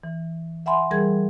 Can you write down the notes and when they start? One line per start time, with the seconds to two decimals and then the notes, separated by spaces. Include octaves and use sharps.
0.04 E3
0.66 E5 F#5 G#5 B5 C6
0.91 E3 G3 G#4 A#4 G#6